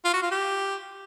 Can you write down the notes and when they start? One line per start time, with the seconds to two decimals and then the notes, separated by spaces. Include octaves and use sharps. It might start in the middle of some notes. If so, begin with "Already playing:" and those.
0.05 F4
0.14 F#4
0.22 F4
0.31 G4